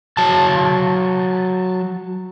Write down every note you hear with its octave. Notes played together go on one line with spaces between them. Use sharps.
F#3 A5